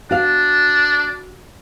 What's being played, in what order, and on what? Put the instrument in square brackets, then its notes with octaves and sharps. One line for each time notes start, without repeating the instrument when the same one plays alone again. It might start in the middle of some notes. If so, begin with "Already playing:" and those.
[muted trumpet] D4 [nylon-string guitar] F#4 F5